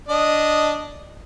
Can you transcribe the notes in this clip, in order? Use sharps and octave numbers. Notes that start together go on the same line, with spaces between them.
D4 D#5